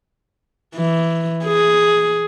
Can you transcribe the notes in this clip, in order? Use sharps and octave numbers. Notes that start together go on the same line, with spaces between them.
E3
G#4